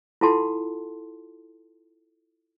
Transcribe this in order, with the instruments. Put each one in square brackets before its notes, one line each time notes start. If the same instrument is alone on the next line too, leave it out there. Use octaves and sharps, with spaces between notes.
[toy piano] E4 F4 A4 F#5 A5 C6